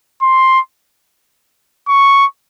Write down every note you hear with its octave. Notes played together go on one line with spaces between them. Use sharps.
C6
C#6